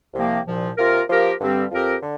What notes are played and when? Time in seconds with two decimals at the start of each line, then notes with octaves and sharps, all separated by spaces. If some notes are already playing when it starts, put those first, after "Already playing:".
0.14 C2 C3 F3 A#3 G4
0.46 C2 A#2 F3
0.77 C3 A#3 F4 A#4
1.08 F3 A#3 G4 A#4
1.40 G2 D3 G3 C4 G4
1.71 F2 F3 C4 G4 A#4
2.02 D3